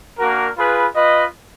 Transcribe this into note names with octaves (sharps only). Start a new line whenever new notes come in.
A#3 D4 F#4 A#4
F4 G#4 B4
F4 B4 D#5